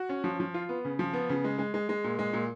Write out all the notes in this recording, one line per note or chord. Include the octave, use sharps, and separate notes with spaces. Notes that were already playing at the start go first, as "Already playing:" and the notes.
Already playing: F#4
C#4
F3
F3
F4
B3
C#3
F3
B3
C#3
G#3
G#3
G#3
G#3
A#2
G#3
A#2